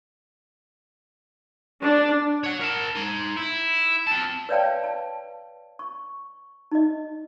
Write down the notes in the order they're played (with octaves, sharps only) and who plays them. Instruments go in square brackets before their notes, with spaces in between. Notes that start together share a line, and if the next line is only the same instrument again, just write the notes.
[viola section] D4
[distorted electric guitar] C#5 F#5
A#4 A5
D#4 C6
E4
C4 A5
[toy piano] B4 C#5 D5 F5 G5 A5
F5
A5
C#6
D#4 D#5